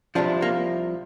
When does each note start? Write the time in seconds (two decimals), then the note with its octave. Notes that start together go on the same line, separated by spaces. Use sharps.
0.15 C2 C3 F3 D4
0.42 A#3